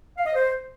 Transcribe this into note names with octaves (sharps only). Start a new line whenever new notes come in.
F5
D#5
C5